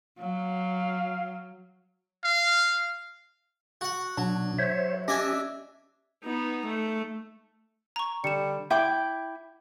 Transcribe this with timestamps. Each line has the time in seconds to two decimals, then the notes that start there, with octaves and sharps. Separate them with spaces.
0.20 F#3 F5
2.24 F5
3.81 F#4 F#5
4.17 B2 F#3 D4
4.58 C5 C#5 E5
5.08 C#4 D4 G4 D#5 E5 G#5
6.24 B3 D#4
6.66 A3
7.96 A#5 C#6
8.24 D3 G3 C#7 E7
8.70 E4 G5 D6